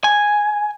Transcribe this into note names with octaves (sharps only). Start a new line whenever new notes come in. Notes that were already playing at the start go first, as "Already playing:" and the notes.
G#5